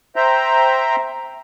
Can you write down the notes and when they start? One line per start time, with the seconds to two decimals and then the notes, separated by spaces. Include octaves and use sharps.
0.16 C5 E5 G5 A#5